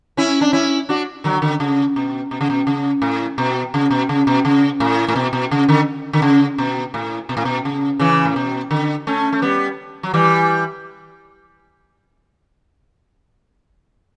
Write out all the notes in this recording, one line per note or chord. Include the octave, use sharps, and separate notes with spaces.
C#4 E4
D4
C#4 E4
D4 F#4
D3 F#3
D3
C#3
B2
B2
C#3
B2
C#3
A2
B2
C#3
B2
C#3
B2
C#3
A2
A2
B2
B2
C#3
D3
D3
C#3
B2
A2
B2
A2
B2
C#3
C#3 E3
A2
B2
D3
A3 C#4
A3
G3 B3
F#3
E3 G3